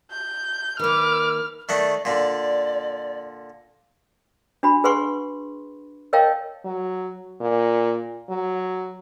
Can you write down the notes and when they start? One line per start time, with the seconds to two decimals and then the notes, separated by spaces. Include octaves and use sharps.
0.10 G6
0.79 D#3 A#3 B4 D6 F6
1.69 D#3 A3 D5 F#5
2.05 A#2 D3 D5
4.63 D4 F#4 B5
4.84 G#4 B4 F#5 C6 C#6
6.13 A#4 C#5 D#5 F5 G5 A5
6.65 F#3
7.40 A#2
8.29 F#3